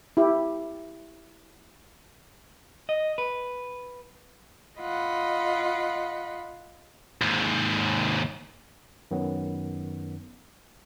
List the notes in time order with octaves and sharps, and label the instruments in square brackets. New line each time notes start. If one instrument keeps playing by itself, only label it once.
[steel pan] E4 G4
[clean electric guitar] D#5
B4
[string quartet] F4 D#5 F#5 B5
[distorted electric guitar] D#2 G#2
[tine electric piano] F#2 D#3 F#3 B3